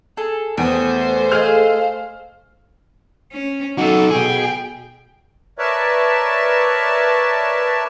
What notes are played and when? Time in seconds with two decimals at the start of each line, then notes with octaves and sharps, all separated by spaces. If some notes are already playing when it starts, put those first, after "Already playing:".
0.17 G#4 A4
0.57 E2 A3 C5 G5 D#6
1.32 G#4 A4 D#5 F5 F6
3.32 C#4
3.78 F#3 D#4 F#4 A4
4.11 B2 G#4 G5
5.58 A#4 B4 C#5 D5 E5 A5